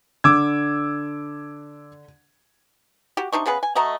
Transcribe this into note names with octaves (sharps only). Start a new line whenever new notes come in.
D3 D6 E6 G#6
F#4 G4
C3 D4 D#4 C#6
C#3 B3 G#4 B4
G#5
A3 F#4 D#5 A#5